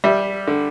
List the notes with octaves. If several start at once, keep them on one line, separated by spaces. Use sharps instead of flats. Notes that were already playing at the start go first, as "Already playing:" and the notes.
G3 E5
D3